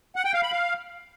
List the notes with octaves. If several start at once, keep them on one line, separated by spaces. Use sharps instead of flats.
F#5
G5
F5
B5
F5